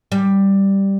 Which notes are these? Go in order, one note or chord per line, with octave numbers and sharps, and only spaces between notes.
G3